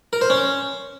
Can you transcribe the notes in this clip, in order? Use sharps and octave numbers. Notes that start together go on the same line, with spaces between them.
A#4
C5
C#4